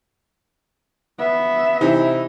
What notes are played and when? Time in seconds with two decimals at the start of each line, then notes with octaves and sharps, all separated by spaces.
1.20 B3 E5
1.81 C3 E3 D#4 E4